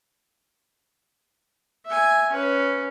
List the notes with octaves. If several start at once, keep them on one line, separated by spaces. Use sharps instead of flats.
E5 G#5
C#4 B4